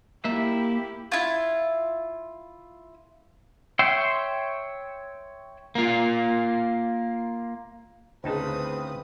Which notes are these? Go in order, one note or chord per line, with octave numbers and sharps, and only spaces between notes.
A#3 E4 G4 E5
E4 F4
C#5 E5 G5 C6
A#3 F4
D2 A2 C#3 C4 D#4 B4 A5 D#6